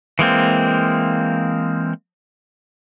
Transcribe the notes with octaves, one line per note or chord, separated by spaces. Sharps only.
E3 G#3 A#3 C4